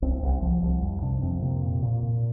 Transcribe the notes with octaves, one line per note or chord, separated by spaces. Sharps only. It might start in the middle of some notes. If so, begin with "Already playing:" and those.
C2 C4
C2
C4
C2 F3
C2
F2 G3
C3 D4
F2 C4
C3 A#3
A#2
A#2
A#2